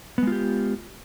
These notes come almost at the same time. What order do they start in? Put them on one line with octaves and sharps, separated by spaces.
B3 G#3 F4 G4